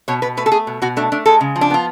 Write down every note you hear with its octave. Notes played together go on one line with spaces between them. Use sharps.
B2 C#5
B2 B4
A3 B4
A4
A3 G#4
B2
B2 F#4
A3 D4
A3 D4
G#3 A4
C#3
F3
D4
B3 F4